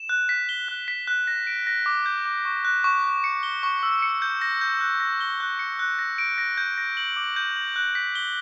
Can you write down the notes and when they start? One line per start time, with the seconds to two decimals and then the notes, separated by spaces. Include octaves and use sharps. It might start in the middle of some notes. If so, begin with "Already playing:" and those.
Already playing: E7
0.09 F#6
0.29 B6
0.49 G7
0.68 F#6
0.88 B6
1.07 F#6
1.27 A#6
1.47 D7
1.67 A#6
1.86 D6
2.06 G6
2.26 D6
2.45 C#6
2.65 F#6
2.84 C#6
3.04 F#6
3.24 C#7
3.43 G7
3.63 C#6
3.83 E6
4.02 C#7
4.22 G6
4.42 A#6
4.61 G6
4.81 F#6
5.00 A#6
5.21 G7
5.40 F#6
5.59 C#7
5.79 F#6
5.99 A#6
6.18 D7
6.38 A#6
6.57 G6
6.78 A#6
6.97 F#7
7.16 D6
7.36 G6
7.56 F#7
7.76 F#6
7.95 B6
8.15 G7